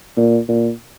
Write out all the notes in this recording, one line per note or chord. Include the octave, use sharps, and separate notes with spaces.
A#2
A#2